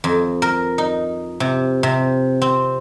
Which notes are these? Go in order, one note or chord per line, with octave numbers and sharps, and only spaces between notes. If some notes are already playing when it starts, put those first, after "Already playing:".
F2
A#4
D#4
C3
C3
C4